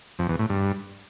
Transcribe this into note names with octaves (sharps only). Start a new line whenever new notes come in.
F2
E2
A2
G2